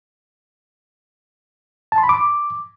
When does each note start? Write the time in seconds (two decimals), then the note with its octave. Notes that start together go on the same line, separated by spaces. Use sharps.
1.92 A5
1.98 C6
2.03 B5
2.09 D6